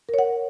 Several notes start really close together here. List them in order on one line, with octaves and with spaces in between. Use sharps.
A#4 C#5 F#5